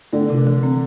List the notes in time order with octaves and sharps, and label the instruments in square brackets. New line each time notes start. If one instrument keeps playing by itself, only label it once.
[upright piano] D3 [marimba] A3
[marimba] C3
E3
C4